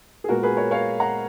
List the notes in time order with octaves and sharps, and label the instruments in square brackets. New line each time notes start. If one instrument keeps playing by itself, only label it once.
[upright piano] G#4
A#2 G#3 B3 F4 F#4 A#4
G#4 B4
A#4 C#5
C#5 F5
F#5 A#5